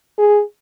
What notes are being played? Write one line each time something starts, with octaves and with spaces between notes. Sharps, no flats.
G#4